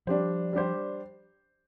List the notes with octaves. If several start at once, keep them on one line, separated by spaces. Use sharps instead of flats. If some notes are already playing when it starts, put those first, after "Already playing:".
F3 G3 D4 G4 C5
G3 D4 G4 C5